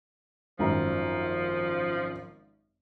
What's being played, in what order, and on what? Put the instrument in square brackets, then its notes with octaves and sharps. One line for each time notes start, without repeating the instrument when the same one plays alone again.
[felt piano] G#1 F#2 A#5 [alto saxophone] F3